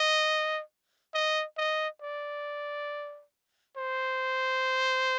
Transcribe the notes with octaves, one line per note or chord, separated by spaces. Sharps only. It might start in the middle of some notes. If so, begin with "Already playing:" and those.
Already playing: D#5
D#5
D#5
D5
C5